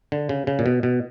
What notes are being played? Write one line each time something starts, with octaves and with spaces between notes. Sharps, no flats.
D3
C#3
C#3
A#2
B2
B2